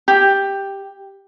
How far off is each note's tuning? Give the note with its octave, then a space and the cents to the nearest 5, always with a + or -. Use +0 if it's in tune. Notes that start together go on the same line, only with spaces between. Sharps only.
G4 +5